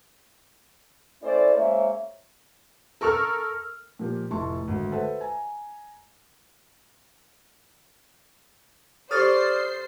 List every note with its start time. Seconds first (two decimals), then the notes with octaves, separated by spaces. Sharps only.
1.22 A3 C#4 E4 A4 C5 D5
1.55 G#3 A#3 C#4 C5 C#5 E5
3.01 A4 A#4 C#6 E6 F6
3.99 A#2 F3 A#3 G4
4.31 F1 A2 E4 A5 C6 C#6
4.67 G#1 D2
4.92 A4 B4 C5 E5 F#5 A5
5.21 G#5 A#5
9.11 G4 A4 C5 D5 D#6 F6 A6 C7